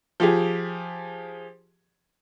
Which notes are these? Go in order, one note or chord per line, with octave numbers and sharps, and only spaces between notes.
F3 G4 G#4